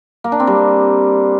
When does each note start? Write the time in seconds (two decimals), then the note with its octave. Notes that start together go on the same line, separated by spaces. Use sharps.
0.24 A#3
0.32 D4
0.40 C4
0.47 G3